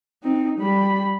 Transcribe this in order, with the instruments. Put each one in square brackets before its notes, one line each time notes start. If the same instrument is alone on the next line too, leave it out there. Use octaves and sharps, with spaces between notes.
[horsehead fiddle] C4 D#4
G3 B5